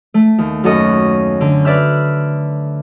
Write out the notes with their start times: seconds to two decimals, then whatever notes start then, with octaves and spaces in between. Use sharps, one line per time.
0.14 A3
0.38 D#2
0.64 F#2 F#4 A4 D#5
1.41 D3
1.65 B4 D5 E5 F6